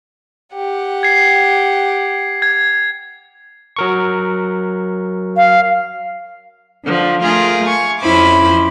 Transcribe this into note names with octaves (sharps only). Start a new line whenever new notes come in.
G4 F#5
G#6 C7
G#6
F#3 A#4 C#6
F5
D3 F3
A3 F4 G#4 A#4
G#5 C#6
F2 C#4 E4 C5 B5 D6